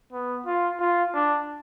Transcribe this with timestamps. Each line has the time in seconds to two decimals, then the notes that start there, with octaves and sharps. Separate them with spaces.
0.12 B3
0.46 F4
0.80 F4
1.14 D4